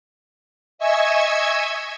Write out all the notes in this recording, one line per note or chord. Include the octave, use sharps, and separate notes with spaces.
D#5 E5 G#5 C#6 E6 G#6